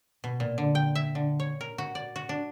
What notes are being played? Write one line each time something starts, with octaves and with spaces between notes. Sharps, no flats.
B2
A#2
D3
G5
E5
D3
C#5
A#4
F#4
D5
F#4
D4